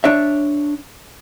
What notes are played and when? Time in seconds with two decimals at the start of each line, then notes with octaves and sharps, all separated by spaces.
0.04 D4 C#5 E5